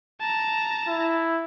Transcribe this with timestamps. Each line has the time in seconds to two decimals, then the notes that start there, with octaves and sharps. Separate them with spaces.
0.21 A5 A#5
0.88 E4